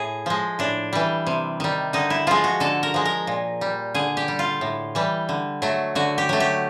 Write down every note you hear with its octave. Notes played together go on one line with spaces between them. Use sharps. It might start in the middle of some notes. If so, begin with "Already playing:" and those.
Already playing: A2 G#4
F3 G#3
A2 D4
E3 G3
C3
D#3 G3
D3 D#4
E4
F3 G#3 F4
F#4
D3 A4
A#4
F3 G#3
A#4
A#2
G3
D3 G#4
G4
G3
F4
A2
E3 G3
D3
F#3 A3
D3 F#4
G4
F#3 A3
G4